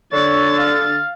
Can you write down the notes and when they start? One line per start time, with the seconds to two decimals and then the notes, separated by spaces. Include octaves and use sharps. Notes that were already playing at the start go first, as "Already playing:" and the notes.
0.13 D3 C#5 A6
0.59 F5